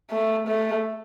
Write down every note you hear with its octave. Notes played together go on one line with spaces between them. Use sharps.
A3
A3